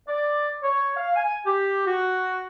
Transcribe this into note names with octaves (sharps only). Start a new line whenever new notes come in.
D5
C#5
F5
G#5
G4
F#4